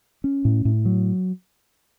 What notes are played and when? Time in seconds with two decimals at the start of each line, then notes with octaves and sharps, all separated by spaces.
0.24 C#4
0.45 A2
0.65 A2
0.85 F#3